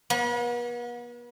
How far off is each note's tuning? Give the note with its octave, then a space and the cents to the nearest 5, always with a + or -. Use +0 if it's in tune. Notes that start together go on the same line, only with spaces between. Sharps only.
B3 -40